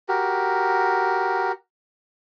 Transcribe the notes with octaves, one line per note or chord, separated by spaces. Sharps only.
F#4 G4 A#4